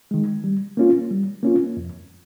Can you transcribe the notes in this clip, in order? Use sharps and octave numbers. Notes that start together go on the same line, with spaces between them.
D#3 G#3
G3
A#3 C#4 F4
G3
A#3 C#4 F4
F2